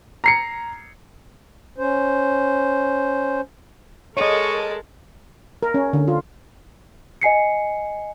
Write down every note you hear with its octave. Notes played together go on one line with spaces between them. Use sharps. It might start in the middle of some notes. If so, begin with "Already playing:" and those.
A#5 C7 C#7
C#4 C5
G#3 A4 A#4 C#5 D#5 A5 C#6
A#4
C#4
D3
F4
D#5 G#5 C7 C#7